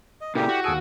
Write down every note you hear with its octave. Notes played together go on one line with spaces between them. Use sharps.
D#5
A#2 C#3 E4 G4 A4 D5
F#4
D#2 G#4 A4 D7 D#7